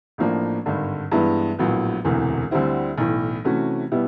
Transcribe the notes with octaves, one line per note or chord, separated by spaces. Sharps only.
A1 A2 F3 A#3 D4
G#1 G2 D3
G2 E3 G#3 B3 E4
A#1 A2 F#3 B3
E1 D2 C3 E3
D2 D3 G3 C4 E4
B1 A2 E3
C3 E3 A3 C#4 F#4
B2 G3 B3 E4